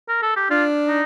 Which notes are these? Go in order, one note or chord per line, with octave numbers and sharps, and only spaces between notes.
A#4
A4
G4
D4 F4
D#4